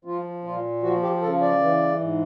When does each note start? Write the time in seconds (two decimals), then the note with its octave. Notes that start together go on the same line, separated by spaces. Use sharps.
0.05 F3 F4
0.44 A#2 F4
0.83 F3 F#4
1.03 G4
1.22 C#3 A4
1.41 D5
1.60 E3
1.99 G#2